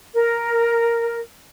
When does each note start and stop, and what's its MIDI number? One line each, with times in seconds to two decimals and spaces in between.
0.14 1.21 70